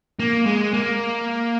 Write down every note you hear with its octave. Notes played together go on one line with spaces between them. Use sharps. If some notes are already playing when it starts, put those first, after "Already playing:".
A#3
G#3
A#3